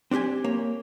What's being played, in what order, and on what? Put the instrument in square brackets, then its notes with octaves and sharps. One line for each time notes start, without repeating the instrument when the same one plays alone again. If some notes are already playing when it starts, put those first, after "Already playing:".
[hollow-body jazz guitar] C4 D4 F#4 G4 G#5
A#3 C#5